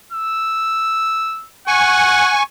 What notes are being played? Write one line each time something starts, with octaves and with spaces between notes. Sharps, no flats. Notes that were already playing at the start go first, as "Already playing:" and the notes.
E6
F#5 G#5 C#6